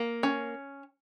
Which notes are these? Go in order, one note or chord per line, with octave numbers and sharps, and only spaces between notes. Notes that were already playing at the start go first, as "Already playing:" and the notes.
Already playing: A#3
C#4